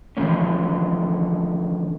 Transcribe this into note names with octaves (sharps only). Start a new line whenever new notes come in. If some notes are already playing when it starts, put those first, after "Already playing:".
D3 E3 F3 A3 A#3 C#4